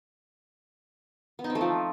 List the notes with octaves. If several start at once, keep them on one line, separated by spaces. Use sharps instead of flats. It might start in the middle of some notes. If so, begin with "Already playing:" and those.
B3
D#4
C4
A3
F3